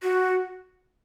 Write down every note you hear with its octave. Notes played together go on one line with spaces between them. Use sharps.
F#4